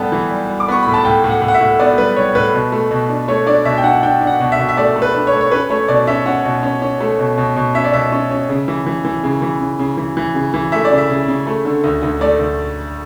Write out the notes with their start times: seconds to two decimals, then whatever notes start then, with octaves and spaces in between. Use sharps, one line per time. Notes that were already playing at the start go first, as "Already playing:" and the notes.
Already playing: A2 G3 B3 G5 A5
0.12 E3
0.31 G3
0.49 G3
0.60 D6
0.68 B3 C#6
0.83 A2 B5
0.94 A5
1.05 A2 G5
1.24 A2
1.30 F#5
1.42 A2
1.48 F#5
1.54 E5
1.61 A2
1.79 B3 D5
1.98 G3 B4
2.16 G3 C#5
2.35 A2 B4
2.54 B2
2.72 A3
2.91 B2
3.09 D4
3.28 A3 C#5
3.46 D4 D5
3.65 B2 E5
3.78 G5
3.84 D4 F#5
4.03 D4 G5
4.21 D4
4.27 F#5
4.40 B2
4.52 E5
4.59 B2
4.69 E5
4.77 A3 D5
4.96 A3
5.02 B4
5.14 D4
5.27 C#5
5.33 A3
5.41 C#5
5.51 C#4 B4
5.70 A3 C#5
5.88 B2 D5
6.07 C#4 E5
6.26 C#4 F#5
6.44 B2
6.63 C#4
6.82 C#4
7.01 A3
7.19 B2
7.37 B2
7.56 B2
7.75 C#4 E5
7.84 D5
7.93 B2 E5
8.12 C#4
8.31 C#4
8.49 C#3
8.68 E3
8.86 E3
9.05 E3
9.23 C#3
9.42 E3
9.61 C#3
9.79 C#3
9.97 E3
10.17 E3
10.35 C#3
10.54 E3
10.72 A3 E5
10.85 D5
10.91 C#3
10.98 E5
11.10 C#3
11.28 C#3
11.47 A3
11.65 D3
11.84 D2
12.03 D2
12.21 A3 D5
12.40 D2